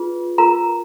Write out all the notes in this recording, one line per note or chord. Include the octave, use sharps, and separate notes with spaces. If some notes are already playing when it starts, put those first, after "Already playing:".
Already playing: F4 G#4 B4
F4 A#4 A#5